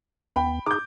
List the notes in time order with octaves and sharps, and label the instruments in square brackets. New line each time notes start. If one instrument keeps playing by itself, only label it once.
[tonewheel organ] D#2 B3 [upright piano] G5 B5
[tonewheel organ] D#4 G#4 [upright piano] D6 G6